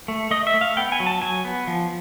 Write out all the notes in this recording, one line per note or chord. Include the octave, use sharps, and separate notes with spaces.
A3
A3 D#5
E5
A3
F5
B3 G5
G#5
F#3
A5
F#3 G#5
B3
F3